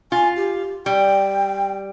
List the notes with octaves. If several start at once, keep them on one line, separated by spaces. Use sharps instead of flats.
F4 G#5
G4
G3 G5